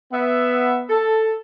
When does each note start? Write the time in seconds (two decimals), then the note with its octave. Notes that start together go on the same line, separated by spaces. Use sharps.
0.12 B3 E5
0.90 A4